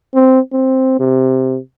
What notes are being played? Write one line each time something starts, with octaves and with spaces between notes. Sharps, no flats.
C4
C4
C3